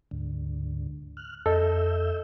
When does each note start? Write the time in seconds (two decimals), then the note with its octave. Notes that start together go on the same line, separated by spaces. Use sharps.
0.11 D2 G#2 D3
1.17 F6 F#6
1.46 F2 A4 D#5 E5 E6 G6